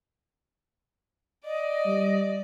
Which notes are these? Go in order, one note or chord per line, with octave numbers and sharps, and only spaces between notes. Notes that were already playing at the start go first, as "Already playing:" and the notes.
D5 D#5
G3